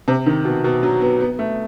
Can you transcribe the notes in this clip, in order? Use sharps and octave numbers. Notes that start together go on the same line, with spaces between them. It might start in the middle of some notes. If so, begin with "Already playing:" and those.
C3
D#3
B2
B2
F#3
B3
B3
A3